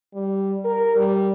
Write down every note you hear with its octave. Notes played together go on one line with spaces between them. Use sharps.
G3
A#4
G3